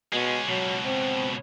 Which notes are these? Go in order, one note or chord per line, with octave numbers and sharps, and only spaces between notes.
B2 G#3 C#4
C#2 B2 F#3
C4